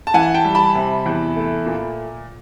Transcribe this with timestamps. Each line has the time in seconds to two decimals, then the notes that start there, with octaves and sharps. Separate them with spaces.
0.07 A5
0.14 E3 F#5 G#5
0.34 G5 A5
0.45 G3
0.55 A5 B5
0.75 C3
1.06 E2
1.36 A3
1.66 A#2